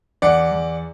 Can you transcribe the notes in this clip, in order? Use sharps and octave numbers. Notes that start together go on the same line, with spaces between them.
E2 D5 F#5
E2